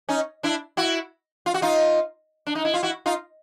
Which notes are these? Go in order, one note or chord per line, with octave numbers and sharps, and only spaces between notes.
C#4 D#4
D4 E4
E4 F#4
F4
F#4
D#4 F4
D4
D#4
E4
F4
E4 F#4
D#4 F4